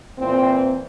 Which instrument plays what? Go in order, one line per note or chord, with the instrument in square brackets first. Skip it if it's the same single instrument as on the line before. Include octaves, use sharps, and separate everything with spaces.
[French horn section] A#2 E3 C4